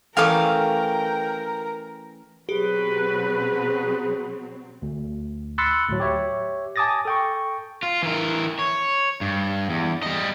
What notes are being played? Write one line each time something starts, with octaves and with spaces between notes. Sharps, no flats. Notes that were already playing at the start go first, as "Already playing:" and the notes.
E3 A3 C#4 A#4 F5 G5 D6
B2 F#3 C4 G4 G#4 B4
D2
B5 C6 E6 F#6 A6 C#7
D2 A2 F#3
G4 C#5 E5
G#5 A5 D6 D#6 A6 A#6
A4 G5 C#6
F4
E3 A#4
C#5
G2
E2
G3 D#5